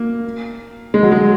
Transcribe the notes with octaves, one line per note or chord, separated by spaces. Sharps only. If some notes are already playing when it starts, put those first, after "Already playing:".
Already playing: A#3
G#3
F#3
G#3